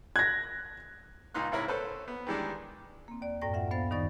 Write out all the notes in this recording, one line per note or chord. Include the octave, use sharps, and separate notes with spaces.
F#6 G#6 A#6
C#2 A#2 D#4 C6 F#6
G#2 C3 E4 A#4 C#5 B5
C#4 A4 B4 C5
B3
D#3 E3 G3 G#3 D4
A#3 C4
D#2 D5
F#2 A2 D5 G5 A#6
F#2 F4 E5 F#5
D2 B3 C5 F5 A6
G2 D#3 D#4 D5 C#6 A6